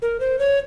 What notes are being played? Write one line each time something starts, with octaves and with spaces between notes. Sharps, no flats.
A#4
C5
C#5